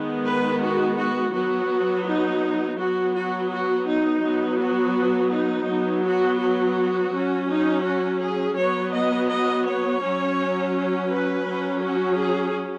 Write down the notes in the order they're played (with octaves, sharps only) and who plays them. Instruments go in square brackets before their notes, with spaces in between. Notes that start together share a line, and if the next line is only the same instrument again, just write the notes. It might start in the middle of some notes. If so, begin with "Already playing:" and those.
Already playing: [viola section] D#3 G#3 B3
B4
F#4
F#4
F#3 B3 F#4
D#4
F#3 B3 F#4
F#4
F#4
D#4
F#3 B3
F#4
D#4
F#3 B3
F#4
F#4
F#3 C#4
D#4
F#4
G#4
F#3 B3 C#5
D#5
D#5
C#5
F#3 C#4
B4
F#3 C#4
F#4
G#4